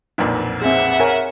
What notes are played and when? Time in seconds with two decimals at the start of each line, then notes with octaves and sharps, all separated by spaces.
0.18 B1 F2 A#2 D4 D#4
0.62 C4 G#4 E5 F#5
1.00 A#4 C#5 G#5